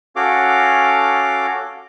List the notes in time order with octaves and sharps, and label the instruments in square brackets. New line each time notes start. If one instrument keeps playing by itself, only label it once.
[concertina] C#4 F#4 A4 F5 D6